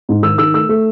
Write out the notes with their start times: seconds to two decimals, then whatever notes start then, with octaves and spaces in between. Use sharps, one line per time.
0.09 G#2
0.23 D#3 E6
0.38 D#3 E6
0.54 A3 E6
0.69 A3